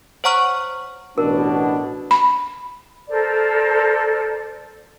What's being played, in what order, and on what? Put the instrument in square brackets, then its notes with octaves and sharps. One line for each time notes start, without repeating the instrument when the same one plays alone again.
[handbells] C5 C#5 F#5 A#5 C#6 F6
[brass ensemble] A1 B2 [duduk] D4 [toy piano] A#4
[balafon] B5
[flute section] A4 A#4 C5 D5